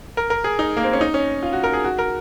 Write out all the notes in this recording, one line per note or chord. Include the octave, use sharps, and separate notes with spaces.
A#4
A#4
G#4
D#4
A#3
C4
C#4
D#4
C#4
F4
F#4
A#4
G#4
F#4
A#4